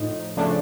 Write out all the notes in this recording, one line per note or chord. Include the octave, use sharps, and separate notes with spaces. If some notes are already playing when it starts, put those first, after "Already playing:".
Already playing: A2 F3 D#4
C#3 F3 A3 D4